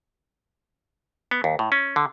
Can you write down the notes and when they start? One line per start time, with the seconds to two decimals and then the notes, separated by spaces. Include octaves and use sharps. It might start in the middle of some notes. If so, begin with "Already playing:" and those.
1.31 B3
1.44 D#2
1.59 A2
1.72 C#4
1.96 D3